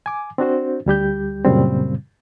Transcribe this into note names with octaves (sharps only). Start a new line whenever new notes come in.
G#5 D6
C4 D4 F#4 C5
D2 G3 G4 G6
F#2 A#2 C#3 G3 C4